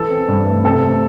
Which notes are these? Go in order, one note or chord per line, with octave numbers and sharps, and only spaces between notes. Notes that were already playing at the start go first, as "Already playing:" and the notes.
Already playing: E3 A4
C4
G2
A3
C3 A4
A3